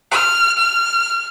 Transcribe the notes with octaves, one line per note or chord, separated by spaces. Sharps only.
F6
F6